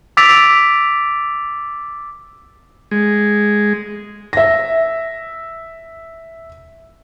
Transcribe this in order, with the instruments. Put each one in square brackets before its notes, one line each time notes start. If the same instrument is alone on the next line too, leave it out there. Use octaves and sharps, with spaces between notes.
[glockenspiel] D6 E6 A6 B6 D7 F7
[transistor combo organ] G#3
[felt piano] E5 A#6